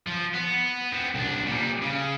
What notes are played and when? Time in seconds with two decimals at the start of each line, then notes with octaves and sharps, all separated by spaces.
0.08 F3
0.35 B3
0.93 B3 C4
1.15 C2 D4
1.46 A#2 G3
1.82 C#3